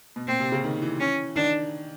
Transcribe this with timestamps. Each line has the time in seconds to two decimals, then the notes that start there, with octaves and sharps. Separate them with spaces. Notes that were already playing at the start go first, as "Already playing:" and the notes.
0.16 B2
0.27 A#2 C4
0.40 C3
0.52 C#3
0.64 D#3
0.82 E3
1.00 C#4
1.36 D#3 D4